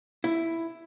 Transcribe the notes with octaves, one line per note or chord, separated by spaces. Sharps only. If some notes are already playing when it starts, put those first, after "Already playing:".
E4